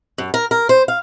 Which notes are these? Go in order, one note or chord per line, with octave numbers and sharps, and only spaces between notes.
F#2
A#4
A#4
C5
F5